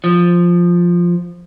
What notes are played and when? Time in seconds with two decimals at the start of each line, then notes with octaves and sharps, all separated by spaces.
0.04 F3